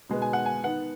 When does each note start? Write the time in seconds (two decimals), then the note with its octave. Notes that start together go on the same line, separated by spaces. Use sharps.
0.09 B2 G#3 B3
0.22 G#5
0.33 F#5
0.46 G#5
0.64 D#3 B3 F#5